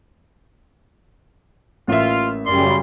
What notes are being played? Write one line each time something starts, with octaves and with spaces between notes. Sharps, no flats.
A1 A#3 F4 E5
F#2 C#3 G3 C#4 D5 C6